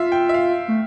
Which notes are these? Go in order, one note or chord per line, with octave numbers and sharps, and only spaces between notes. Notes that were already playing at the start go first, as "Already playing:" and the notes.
Already playing: F4 E5 F5
G5
E5
F5
A3